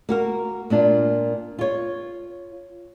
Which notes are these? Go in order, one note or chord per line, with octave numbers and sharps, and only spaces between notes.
A#3 F#4 A#4
A#2 A#3 D4 F4
F4 C#5